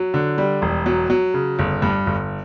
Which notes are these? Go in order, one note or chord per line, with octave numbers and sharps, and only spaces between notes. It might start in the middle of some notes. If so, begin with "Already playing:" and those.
Already playing: F#3
D3
G3
E1
F#3
F#3
C#3
G1
G2
G1